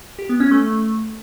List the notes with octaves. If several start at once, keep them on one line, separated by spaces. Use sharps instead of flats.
G4
B3
C#4
A3